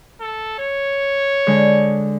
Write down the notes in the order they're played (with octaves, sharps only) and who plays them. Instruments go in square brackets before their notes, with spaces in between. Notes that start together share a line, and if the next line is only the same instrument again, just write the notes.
[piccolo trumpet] A4
C#5
[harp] D3 G#3